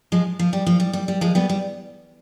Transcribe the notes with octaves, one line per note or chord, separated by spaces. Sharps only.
F3 G#3
F3
G3
F3
G3
G3
G3
F3 G#3
G3 B3
G3